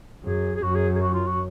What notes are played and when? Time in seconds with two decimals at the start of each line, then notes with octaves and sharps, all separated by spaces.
0.24 F#2 G#4
0.56 G#4
0.63 F#2 F#4
0.75 G#4
0.96 G#4
1.01 F#4
1.14 F4
1.27 F#4